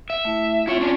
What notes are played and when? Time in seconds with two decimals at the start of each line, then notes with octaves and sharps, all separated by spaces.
0.10 E5
0.25 A3 E4
0.67 C4 E4 F4 C#5
0.81 C#4 D4